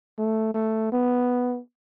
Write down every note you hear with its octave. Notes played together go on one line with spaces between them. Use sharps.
A3
A3
B3